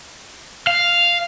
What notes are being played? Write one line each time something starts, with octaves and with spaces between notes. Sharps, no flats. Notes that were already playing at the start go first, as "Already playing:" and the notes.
F5